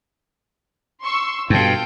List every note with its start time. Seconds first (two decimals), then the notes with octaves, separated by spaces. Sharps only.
1.01 C6 C#6 E6
1.50 G2 B2 F4 A4 G5